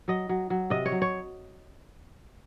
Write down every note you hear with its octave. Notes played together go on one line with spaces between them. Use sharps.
F#3 D#5
F#3
F#3
C3 D#5
C#5
F#3
C#5